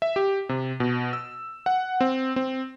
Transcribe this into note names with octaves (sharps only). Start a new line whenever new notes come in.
E5
G4
C3
B2
E6
F#5
C4
C4